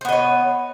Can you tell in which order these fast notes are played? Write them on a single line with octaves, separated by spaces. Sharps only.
C5 B3 D#5 C#5